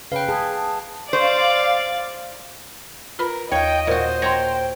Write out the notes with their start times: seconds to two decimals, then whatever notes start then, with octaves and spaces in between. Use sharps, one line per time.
0.12 C#3 B4 F5 G5
0.29 G#4 A5
1.13 C5 D5 F5
3.19 F4 A#4 B4 B5
3.52 D#2 C#5 D#5 F5 G5
3.87 A#2 F#4 C5
4.22 C#5 G5 A#5 C6 A#6